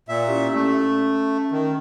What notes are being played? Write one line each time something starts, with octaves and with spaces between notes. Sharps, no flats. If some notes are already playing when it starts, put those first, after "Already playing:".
A#2 E5
C#4 E4 G4
A3 C#4
D#3